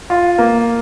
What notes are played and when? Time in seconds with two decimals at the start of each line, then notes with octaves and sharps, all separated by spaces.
0.10 F4
0.38 A#3